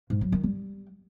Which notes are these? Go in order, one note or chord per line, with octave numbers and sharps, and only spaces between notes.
G#2
F#3
D#3
G3